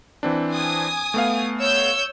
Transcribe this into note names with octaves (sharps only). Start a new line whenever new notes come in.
E3 C4 D4
G#5 D#6
A3 B3 F5
C#5 E6 G6